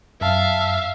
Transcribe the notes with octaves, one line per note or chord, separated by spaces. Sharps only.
F#2 E5 F5 A5